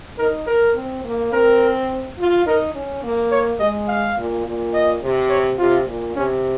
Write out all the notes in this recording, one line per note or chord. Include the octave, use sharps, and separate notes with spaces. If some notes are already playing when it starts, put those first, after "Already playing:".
D#4 A#4
A#4
C4
A#3
C4 A#4
F4
D#4 A#4
C#4
A#3
C#5
G#3 D#5
F5
A#2
A#2
D#5
C3
C#5
C3 F4
A#2
C3 C#4